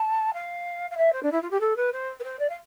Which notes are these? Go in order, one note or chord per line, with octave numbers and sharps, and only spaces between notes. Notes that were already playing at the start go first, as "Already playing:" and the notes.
Already playing: A5
F5
F5
E5
C5
D4
E4
F4
G4
A4
B4
C5
B4
C5
D5
F5